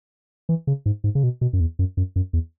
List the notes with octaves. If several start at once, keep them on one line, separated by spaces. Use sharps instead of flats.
E3
C#3
G#2
G#2
C#3
B2
B2
F#2
E2
F#2
F#2
F#2
E2